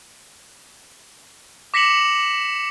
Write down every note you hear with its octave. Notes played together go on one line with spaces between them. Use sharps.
D6 A#6 B6 C#7 E7 F#7